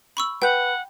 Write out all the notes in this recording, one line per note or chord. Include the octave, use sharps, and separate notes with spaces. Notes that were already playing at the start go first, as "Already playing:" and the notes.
B5 C#6 E6
B4 F#5 G5 G6